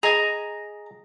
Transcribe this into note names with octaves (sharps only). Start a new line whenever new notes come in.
G#4 D#5 G#5 A#5